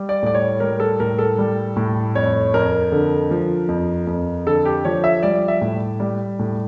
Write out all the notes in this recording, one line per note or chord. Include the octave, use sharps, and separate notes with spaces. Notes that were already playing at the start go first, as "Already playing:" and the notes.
Already playing: G3
D5
A2 D5
C#5
G3 A#4
A4
A2 A#4
A4
G3
A2
F2 C#5
F2 A#4
D3
F3
F2
F2
D3 A4
G4
F3 C#5
E5
G3 D5
E5
A2
G3
A2